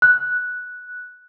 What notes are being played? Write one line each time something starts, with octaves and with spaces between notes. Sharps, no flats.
F#6